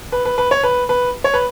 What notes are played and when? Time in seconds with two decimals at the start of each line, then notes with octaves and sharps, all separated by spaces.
0.12 B4
0.25 B4
0.38 B4
0.51 C#5
0.63 B4
0.89 B4
1.24 C#5
1.34 B4